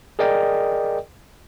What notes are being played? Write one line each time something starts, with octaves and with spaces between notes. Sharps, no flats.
G#4 A#4 D5 D#5 G5